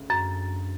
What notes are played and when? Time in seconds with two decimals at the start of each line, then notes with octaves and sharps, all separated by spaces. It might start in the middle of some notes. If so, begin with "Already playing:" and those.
Already playing: D2 C#3
0.10 F#2